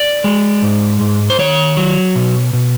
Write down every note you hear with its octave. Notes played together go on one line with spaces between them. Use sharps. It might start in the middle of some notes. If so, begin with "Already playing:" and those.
Already playing: D5
G#3
G#2
G#2
C5
D#3 C#5
F#3
B2
B2